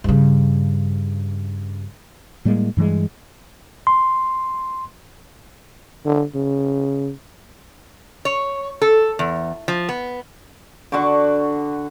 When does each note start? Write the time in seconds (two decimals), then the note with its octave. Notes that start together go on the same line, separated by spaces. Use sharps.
0.04 G2 C#3
2.45 A2 G3 G#3 A#3
2.77 G2 E3 G3 G#3
3.87 C6
6.06 D3
6.35 C#3
8.25 C#5
8.82 A4
9.19 E2
9.68 F3
9.89 B3
10.92 D3 F#4 C#6 D6